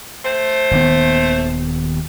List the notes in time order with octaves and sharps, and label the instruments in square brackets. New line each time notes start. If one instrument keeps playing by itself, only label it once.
[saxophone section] A3 C5
[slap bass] D#1 D#2 B3